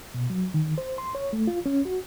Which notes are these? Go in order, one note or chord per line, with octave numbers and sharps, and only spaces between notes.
B2
F#3
D#3
C5
C6
C#5
A3
F4
C#4
F#4